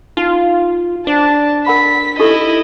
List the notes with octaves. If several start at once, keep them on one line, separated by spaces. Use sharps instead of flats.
D#4 F4
D4 C5 A5
A#4 F#5 B5 B6
D#4 E4 G4 A4 D#5